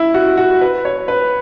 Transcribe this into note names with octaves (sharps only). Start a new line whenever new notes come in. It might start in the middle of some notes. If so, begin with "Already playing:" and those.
Already playing: E4
F#4
F#4
B4
C#5
B4